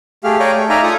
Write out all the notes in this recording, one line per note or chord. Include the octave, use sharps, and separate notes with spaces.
A3 G4 G#4 F5
C#5 D5 F5 G5 G#5 A#5
A3
D#4 D5 E5 F5 G#5 A#5
F4 A4 G#5 D#6